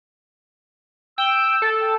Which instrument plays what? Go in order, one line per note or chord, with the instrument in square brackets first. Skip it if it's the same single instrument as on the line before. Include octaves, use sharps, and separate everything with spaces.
[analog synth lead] G5 [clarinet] E6
[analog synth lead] A4
[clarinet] G5